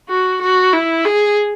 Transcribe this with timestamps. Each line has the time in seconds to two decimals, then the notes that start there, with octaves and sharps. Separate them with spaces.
0.09 F#4
0.41 F#4
0.73 E4
1.05 G#4